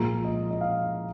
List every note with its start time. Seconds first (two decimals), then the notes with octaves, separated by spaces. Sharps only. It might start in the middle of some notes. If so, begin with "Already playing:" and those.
Already playing: A#2 F3 G#3 A#5
0.25 D#5
0.51 D#5
0.61 F5